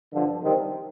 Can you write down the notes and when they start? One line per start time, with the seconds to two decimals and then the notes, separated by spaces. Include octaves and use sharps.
0.13 G2 D3 F3
0.42 C3 D#3 G3 C4